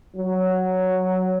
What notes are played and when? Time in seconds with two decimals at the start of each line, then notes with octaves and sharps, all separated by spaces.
0.15 F#3